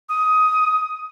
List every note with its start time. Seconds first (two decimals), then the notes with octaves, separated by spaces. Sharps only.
0.09 D#6